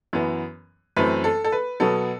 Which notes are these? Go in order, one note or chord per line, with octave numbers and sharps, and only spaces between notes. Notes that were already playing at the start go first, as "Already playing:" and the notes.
F#2 E3 B3
F#2 E3 A3 C4 B4
A4
A4
B4
B2 F#3 B3 A4